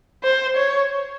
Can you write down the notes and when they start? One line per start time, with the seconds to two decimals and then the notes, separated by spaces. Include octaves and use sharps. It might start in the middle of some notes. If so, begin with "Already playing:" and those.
0.24 C5
0.56 C#5